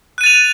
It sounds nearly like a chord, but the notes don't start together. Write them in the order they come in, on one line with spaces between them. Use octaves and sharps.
F#6 D#7 A6 F7